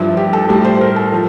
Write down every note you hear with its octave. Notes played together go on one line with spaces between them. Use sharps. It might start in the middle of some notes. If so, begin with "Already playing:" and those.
Already playing: G2 F3 E4
G4
A4
A2 G3
C5
A#4
A4
F3